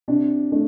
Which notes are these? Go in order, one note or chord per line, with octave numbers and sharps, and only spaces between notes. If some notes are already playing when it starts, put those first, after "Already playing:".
C3 D4
A3 D4